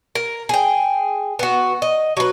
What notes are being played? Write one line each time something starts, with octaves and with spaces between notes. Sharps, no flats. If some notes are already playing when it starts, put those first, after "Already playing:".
A#4
G#4 G5
B3 F#4
D#5
F#3 B4